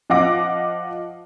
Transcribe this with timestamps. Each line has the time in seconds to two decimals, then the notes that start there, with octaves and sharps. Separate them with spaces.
0.10 F3 D#5 F5 F#5 D6 A#6